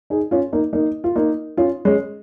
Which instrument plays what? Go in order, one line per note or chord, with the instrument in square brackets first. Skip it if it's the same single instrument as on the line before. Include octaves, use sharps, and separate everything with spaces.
[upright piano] D#4 G#4
C#4 F4
A#3 D#4
A#3 D#4
F4
A#3 D#4
C#4 F4
G#3 C#4